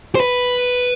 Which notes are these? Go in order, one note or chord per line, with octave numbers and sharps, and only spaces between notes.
C5
B4